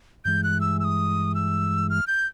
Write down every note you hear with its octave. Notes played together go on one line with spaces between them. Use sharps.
G2 E3 G#3 G6
F#6
E6
E6
D#6
E6
F6
G6